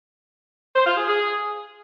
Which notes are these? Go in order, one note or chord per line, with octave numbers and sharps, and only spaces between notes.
C5
F4
G#4
G#4